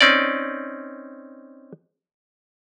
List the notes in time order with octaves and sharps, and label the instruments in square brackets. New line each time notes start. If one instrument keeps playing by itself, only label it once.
[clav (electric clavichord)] C4 C#4 D#4 D5